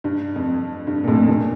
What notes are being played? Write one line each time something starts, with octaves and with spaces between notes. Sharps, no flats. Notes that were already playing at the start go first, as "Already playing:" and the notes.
G2
F2
G2
A#2
F2 A2
G2 A#2